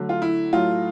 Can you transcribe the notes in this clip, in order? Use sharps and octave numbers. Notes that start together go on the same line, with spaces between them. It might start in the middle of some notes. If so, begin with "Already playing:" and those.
Already playing: D3 F#3 A3
F4
E4
A2 F#3 A3 F4